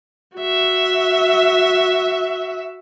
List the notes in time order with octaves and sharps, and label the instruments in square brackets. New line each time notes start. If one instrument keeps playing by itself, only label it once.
[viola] F#4 E5